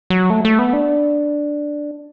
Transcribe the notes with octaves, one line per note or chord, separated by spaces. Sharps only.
F#3
A3
A3
B3
D4